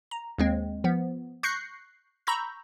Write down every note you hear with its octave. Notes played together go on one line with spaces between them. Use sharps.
A#5
D#2 G#3 C4
F3 B3
C#6 F#6 G6 A#6 C7 C#7
A#5 B5 C#6 E6 G6 A#6